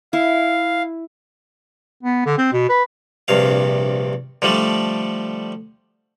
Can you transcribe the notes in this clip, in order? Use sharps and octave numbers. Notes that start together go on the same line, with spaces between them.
E4 F5
B3
D3
C4
B2
B4
A#1 G2 C3 F5
D3 F3 G3 A3